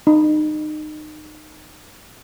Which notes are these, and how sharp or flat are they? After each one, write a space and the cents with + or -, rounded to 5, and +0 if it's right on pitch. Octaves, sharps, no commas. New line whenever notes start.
D#4 -25